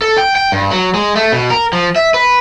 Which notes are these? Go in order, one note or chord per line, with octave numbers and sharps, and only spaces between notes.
A4
G5
G5
G2
F#3
G#3
A3
B2
A#4
F3
E5
B4